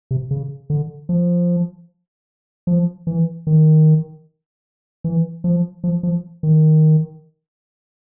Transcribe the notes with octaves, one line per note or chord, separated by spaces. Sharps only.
C3
C#3
D3
F3
F3
E3
D#3
E3
F3
F3
F3
D#3